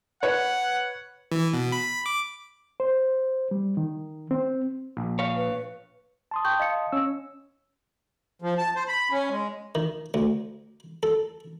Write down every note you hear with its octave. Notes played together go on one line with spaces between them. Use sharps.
B4 C#5 F#5
E3
B2
B5
D6
C5
G3
D#3
C4
A#1
C#5 F5
B4
A5 C6 D#6
G5 C#6 G6
D#5 F5 C#7
C#4 C#5 E6
F3
A5
C5
B5
C#4
G#3
D#3
D2
A4